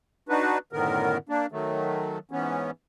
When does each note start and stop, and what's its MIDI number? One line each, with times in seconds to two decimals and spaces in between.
0.29 0.58 62
0.29 0.58 63
0.29 0.58 66
0.29 0.58 71
0.73 1.17 42
0.73 1.17 45
0.73 1.17 50
0.73 1.17 51
0.73 1.17 59
0.73 1.17 70
1.29 1.46 58
1.29 1.46 62
1.52 2.18 51
1.52 2.18 54
1.52 2.18 57
2.31 2.71 44
2.31 2.71 52
2.31 2.71 59
2.31 2.71 61